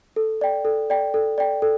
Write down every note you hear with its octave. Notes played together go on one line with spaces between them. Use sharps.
A4
D5 G5
A4
D5 G5
A4
D5 G5
A4